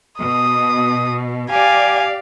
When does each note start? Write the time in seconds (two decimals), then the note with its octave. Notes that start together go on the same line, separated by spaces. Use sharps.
0.20 B2 D#6
1.51 G4 D5 F5 G#5